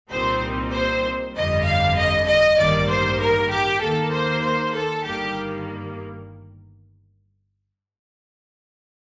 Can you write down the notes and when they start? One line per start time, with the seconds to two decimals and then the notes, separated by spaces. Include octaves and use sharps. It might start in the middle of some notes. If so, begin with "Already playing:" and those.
0.11 C2 A#2 G3 C4 D#4 C5
0.73 C5
1.34 G1 F2 D3 G3 D#5
1.66 F5
1.97 D#5
2.27 D#5
2.58 A1 G2 D#3 G3 A#3 D5
2.88 C5
3.20 A#4
3.50 G4
3.81 D#2 D#3 A#3 A4
4.12 C5
4.42 C5
4.74 A4
5.04 G1 G2 D#3 G3 A#3 G4